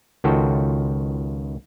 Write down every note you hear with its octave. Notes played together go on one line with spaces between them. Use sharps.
C#2 D#3 F4 F#4 A4 G5